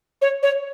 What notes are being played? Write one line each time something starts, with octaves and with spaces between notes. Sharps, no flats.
C#5
C#5